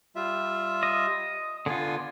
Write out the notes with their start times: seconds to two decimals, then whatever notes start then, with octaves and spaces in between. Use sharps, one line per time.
0.16 G3 F4 E5
0.83 D#5
1.66 D3 B3 F4 G#5